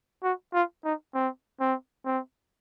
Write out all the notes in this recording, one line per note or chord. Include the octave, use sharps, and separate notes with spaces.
F#4
F4
D#4
C4
C4
C4